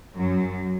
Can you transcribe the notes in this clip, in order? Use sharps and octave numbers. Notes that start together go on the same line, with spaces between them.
F#2 F#3